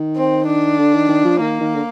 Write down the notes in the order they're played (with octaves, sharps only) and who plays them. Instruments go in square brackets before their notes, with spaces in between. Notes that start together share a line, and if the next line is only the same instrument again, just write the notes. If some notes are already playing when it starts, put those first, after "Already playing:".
Already playing: [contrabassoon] D#3
[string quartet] C4
D4
[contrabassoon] D3
D#3
D#3
F3
[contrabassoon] D#3 [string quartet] A#3
[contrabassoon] D#3
D3